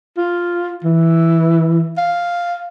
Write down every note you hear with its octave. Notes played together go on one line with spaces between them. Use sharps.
F4
E3
F5